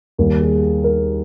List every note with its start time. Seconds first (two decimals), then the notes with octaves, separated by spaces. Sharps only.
0.18 D#2 D#3 G3 A#4
0.41 G#4
0.84 A#4